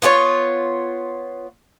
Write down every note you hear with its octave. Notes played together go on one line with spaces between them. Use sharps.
B3 F4 G4 C#5